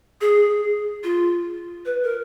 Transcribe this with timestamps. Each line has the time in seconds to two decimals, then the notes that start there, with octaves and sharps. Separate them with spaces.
0.21 G#4
1.04 F4
1.86 B4
2.04 A#4